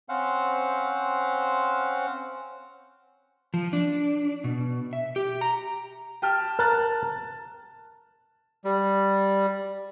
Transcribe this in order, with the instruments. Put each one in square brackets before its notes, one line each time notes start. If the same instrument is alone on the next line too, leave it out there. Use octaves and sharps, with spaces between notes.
[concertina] C4 C#4 C5 F5 F#5
[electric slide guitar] F3
D4
B2
E5
G4
A#5
[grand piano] G4 G5 F6 [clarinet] A5
[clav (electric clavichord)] A#4 [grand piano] F6 F#6 A6
[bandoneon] G3